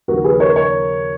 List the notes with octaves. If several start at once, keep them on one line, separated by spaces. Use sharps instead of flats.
D#2 C#3 F3 F#4 A#4
G#4 B4
A#4 C#5
A#4 C#5